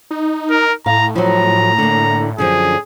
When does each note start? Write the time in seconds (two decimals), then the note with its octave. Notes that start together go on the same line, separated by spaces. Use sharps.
0.11 D#4
0.50 A#4
0.86 A2 F5 A#5
1.16 F3 F#3 A#5
1.78 D3 A#3
2.38 F#2 D3 F3 G#4